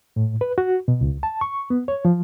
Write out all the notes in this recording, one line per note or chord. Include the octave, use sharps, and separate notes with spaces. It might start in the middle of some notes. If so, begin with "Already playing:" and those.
A2
B4
F#4
B2
C#2
A5
C#6
B3
C#5
F3